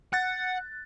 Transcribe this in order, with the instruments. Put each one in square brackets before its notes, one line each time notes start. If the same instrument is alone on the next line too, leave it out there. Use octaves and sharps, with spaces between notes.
[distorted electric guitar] F#5 [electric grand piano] F#6 A6